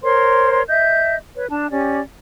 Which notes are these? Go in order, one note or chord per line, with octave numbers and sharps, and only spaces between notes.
A#4 C5 C#5 C6
D#5 E5 G6
B4 C#5
D4 A5
C#4 G4 D5